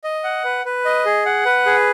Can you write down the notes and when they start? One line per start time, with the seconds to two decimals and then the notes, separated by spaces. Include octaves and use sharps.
0.04 D#5
0.24 F#5
0.44 B4
0.65 B4
0.85 D#5
1.05 G#4
1.26 F#5
1.46 B4
1.66 G#4